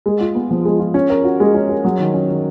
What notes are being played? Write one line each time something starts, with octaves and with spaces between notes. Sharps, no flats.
G#3
F4
B3
F3
G#3
F4
C#4
A#4
F#4
G#3
C#4
A#4
F#3
D#3
C#4
D#3